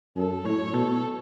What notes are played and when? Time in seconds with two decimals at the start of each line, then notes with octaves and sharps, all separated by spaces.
0.17 F#2 A4
0.45 A2 C#5
0.73 B2 A4